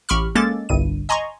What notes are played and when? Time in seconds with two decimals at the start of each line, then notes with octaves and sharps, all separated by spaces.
0.09 A1 G4 B5 C#6 F6
0.35 G#3 A#3 C#4 A4 D6 A6
0.69 G1 C2 G2 D#7
1.09 D#5 G#5 A#5 C6 C#6